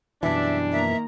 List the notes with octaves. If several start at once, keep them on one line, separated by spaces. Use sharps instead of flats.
F#2 B2 E3 G3 D4 E5
D#3 A#3 E5 A#5